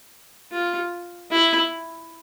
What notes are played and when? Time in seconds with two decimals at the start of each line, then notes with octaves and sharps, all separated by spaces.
0.52 F4
1.31 E4